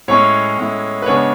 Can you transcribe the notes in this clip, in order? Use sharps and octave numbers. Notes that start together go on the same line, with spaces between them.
A2 G#3 C#4 E4 C#5
A2 G#3 C#4 E4
B4
C#3 G#3 B3 D4 C#5